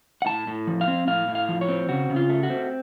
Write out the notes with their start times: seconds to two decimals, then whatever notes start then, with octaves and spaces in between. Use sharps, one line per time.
0.22 F#5
0.26 A2 A5
0.47 A2
0.67 F3
0.81 F5
0.88 C4
1.07 A2 F5
1.28 A2
1.35 F5
1.49 F3
1.61 C#5
1.69 C4
1.89 C#3 F#4
2.10 C#3
2.16 F4
2.29 A3
2.43 F#4
2.50 C4